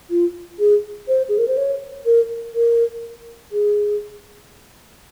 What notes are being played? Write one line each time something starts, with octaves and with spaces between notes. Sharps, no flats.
F4
G#4
C5
G#4
A#4
C5
C#5
A#4
A#4
G#4